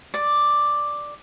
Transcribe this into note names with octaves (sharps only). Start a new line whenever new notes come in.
D5